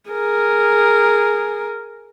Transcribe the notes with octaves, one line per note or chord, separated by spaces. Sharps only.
G#4 A#4